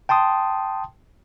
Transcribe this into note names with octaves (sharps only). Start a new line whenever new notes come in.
G5 A5 C6 D#6